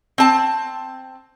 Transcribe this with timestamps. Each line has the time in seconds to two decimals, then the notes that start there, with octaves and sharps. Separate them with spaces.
0.18 C4 A5